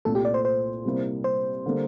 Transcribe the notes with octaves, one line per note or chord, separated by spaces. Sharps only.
C2 A#2 A3 A4
G4
D5
C5
C5
C3 G3 A#3 E4
C5
D3 G3 A#3